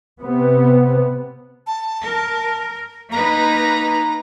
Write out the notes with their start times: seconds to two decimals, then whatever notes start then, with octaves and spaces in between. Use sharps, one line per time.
0.20 C3 B3
1.67 A5
2.04 A#4
3.12 A#3 D#4 B4 A#5